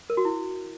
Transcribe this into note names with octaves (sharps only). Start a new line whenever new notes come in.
A#4
F#4
E4